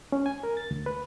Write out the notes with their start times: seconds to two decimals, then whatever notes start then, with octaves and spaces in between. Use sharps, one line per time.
0.12 C#4
0.26 G#5
0.43 A#4
0.57 A6
0.71 D2
0.86 B4